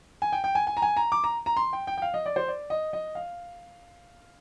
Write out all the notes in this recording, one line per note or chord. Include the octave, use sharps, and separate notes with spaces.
G#5
G5
G5
G#5
G#5
A#5
G#5
A#5
D6
A#5
A#5
C6
G5
G5
G5
F5
D#5
D5
C5
D5
D#5
D#5
F5